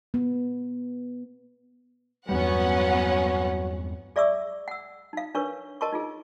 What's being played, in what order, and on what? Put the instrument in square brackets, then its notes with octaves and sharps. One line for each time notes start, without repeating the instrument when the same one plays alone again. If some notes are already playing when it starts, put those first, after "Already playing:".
[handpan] B3
[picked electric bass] E2 G2 G3 [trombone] F#3 [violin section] B3 C#4 F#5
[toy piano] G#4 D5 E5 C#6 D6 E6
F#5 E6
D#4 F5
D4 A#4 B4 C#5 C#6
A#4 D#5 A5 C6 C#6
D#4 F4 G#4